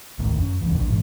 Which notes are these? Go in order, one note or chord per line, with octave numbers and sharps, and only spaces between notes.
G#1 D2 A2 D#3
F#2
E1 C#2 E3
A#1 A#2 D4
G#2 E3